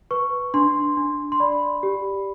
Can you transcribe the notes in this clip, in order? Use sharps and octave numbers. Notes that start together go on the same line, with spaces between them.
B4 C#6
D4 C6
D4
C6
D5 B5
G4